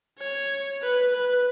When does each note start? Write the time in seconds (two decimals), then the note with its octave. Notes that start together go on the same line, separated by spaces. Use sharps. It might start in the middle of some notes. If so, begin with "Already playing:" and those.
0.19 C#5
0.82 B4
1.14 B4